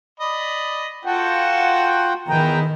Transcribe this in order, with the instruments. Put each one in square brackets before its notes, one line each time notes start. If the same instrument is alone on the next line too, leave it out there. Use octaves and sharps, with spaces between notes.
[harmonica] D5 D#5 B5
[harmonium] F4 F#5 G5 [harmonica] F#4 A4 A5
[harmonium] E2 G5 A#5 [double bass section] D#3 [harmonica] B3 E4 G#4